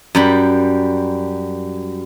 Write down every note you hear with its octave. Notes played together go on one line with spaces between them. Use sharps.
F#2 G3 B5